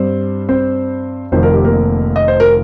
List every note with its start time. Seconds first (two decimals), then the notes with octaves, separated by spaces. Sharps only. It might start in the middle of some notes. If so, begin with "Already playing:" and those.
Already playing: G2 G3 C4 C5
0.49 C4 C5
1.32 F1 F2 D#3 C4 C5
1.43 A#4
1.54 G4
1.64 A#3 A#4
2.16 D#5
2.28 C5
2.40 A#4